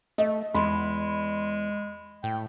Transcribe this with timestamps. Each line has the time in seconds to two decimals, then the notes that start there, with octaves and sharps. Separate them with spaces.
0.18 A3 D#5
0.54 E2 G#3 B5 C6
2.24 A2 G5